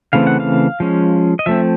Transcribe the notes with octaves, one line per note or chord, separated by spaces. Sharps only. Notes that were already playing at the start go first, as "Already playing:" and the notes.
C#3 E3 A3 C4 F5
F#5
F5
F3 G#3 C#4
D#5
F3 A3 C4 E5